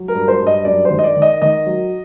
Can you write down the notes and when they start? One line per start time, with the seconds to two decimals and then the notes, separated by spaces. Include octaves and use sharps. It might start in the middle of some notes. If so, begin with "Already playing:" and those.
Already playing: F#3
0.08 A#4
0.14 G2
0.28 C5
0.40 G2
0.47 D#5
0.65 F#2 D5
0.85 C5
0.90 D#3
0.99 D#5
1.04 D5
1.16 D#3
1.22 D#5
1.42 D#3 D#5
1.66 F#3